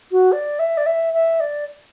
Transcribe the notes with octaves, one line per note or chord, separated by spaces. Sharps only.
F#4
D5
E5
D5
E5
E5
D5